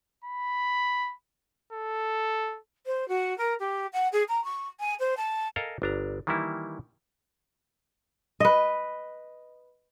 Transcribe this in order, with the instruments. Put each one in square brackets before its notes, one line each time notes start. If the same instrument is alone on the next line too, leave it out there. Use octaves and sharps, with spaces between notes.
[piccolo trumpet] B5
A4
[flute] C5
F#4
A#4
G4
F#5
G#4
A#5
C#6
G#5
C5
A5
[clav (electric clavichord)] A4 A#4 D#5 F5 G#5 A#5
G1 D4 A#5
D#3 E3 G3 A#3 E4
[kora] B4 D#5